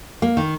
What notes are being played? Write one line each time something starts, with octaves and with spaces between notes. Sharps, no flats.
A#3
D#3